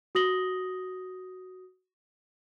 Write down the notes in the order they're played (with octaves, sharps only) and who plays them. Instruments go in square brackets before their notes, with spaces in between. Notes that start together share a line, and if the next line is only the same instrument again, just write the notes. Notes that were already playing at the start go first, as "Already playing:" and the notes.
[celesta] F#4 D#6 A#6 F#7 G7